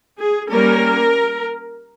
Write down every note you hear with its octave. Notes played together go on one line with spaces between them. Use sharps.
G#4
G3 A#3 C#4 A#4